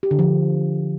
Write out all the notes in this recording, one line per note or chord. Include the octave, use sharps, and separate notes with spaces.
G4
D3
F3